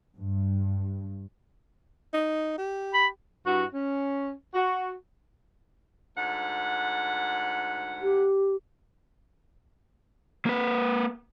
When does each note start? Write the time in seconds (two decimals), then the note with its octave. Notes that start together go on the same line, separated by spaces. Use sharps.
0.16 G2
2.13 D#4
2.58 G4
2.94 B5
3.46 G2 E4 F#4
3.74 C#4
4.54 F#4
6.16 D2 G#2 F#5
8.02 G4
10.46 A#3 B4